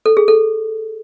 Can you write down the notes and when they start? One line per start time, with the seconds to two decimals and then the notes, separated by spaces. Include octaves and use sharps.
0.06 A4
0.17 G#4
0.28 A4